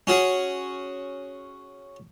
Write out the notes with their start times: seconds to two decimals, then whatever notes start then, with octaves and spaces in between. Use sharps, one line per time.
0.07 C#4 F#4 G#4